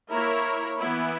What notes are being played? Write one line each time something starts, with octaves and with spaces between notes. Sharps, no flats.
A#3 E4 A#4 C#5
E3 B3 E4